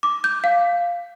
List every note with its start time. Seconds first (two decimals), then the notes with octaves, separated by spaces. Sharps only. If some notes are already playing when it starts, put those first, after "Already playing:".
0.03 D6
0.24 G6
0.44 F5